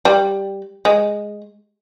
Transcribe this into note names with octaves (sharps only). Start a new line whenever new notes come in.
G3
G#3